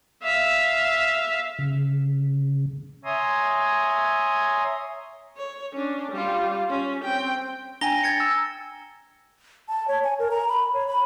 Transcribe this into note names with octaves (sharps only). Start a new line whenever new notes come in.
E5 F5
C#3
C#5 E5 G#5 A#5 C6 D#6
C#5
C#4 D4
G3 F4
C#4
C4 G5
D4 G5 G#5 A#5 A#6 G7
G#6 A6 C#7
E6
A5
C#5
G#5
A#4
A#5
B5
C#5
B5